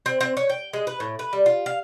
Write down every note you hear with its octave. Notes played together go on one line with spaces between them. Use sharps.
C4
C4
C#5
G5
G#3
B4
A2
B4
G3
F4
F5